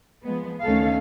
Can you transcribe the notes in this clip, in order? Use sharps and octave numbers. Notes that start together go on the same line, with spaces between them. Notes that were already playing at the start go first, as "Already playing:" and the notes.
F3 G#3 B3
D2 D#3 A3 C#4 A4 F5